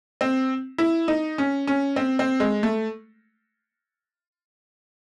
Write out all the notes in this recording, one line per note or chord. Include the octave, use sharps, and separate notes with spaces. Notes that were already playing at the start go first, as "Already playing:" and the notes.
C4
E4
D#4
C#4
C#4
C4
C4
G#3
A3